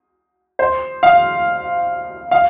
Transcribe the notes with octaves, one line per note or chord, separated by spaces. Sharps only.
C5
F5
F5